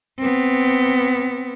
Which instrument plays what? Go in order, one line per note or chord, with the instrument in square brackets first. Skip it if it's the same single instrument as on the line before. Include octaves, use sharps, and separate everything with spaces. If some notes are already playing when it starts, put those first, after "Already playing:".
[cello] B3 C4